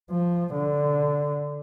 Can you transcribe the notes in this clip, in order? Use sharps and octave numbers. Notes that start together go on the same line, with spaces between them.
F3
D3